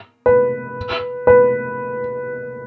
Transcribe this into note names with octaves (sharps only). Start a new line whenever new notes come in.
B4
B4